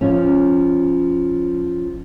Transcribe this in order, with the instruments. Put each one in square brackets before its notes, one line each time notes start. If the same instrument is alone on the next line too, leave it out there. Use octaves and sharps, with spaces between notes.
[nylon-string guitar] F3 C#4